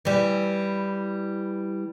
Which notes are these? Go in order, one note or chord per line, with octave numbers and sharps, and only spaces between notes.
E3 G3